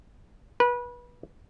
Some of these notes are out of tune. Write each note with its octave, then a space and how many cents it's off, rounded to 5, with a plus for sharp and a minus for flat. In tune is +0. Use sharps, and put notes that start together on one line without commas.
B4 -25